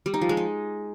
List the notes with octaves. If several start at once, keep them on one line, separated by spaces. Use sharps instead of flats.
G3
D#4
F3
G#3
D#4